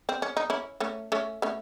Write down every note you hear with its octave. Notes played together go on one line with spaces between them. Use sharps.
C4
C#4
D#4
C#4 E4
A3 C#4
A3 C#4
A3 C#4